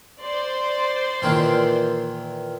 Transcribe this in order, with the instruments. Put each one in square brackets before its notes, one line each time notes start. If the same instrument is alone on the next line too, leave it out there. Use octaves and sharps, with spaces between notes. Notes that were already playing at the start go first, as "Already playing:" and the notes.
[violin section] C5 D5 C6
[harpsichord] A#2 D#3 E3